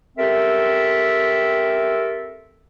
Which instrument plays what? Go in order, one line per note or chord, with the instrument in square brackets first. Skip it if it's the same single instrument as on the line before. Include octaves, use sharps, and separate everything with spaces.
[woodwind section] C4 G4 A4 A#4 E5